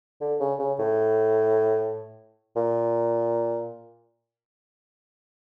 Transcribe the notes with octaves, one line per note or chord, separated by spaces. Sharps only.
D3
C#3
C#3
A2
A#2